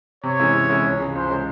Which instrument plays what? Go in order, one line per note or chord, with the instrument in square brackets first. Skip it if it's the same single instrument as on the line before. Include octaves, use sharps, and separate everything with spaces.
[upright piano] C3 [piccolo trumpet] C#5
[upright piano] E3 G#3 C#4 E4
C3
E3 G#3 C#4 E4
C#2
C#3 G#3
[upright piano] C#2 [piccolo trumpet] C5
[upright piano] C#3 G#3